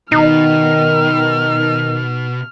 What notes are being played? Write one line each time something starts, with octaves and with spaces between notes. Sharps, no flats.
B2 D#3 D#4 F6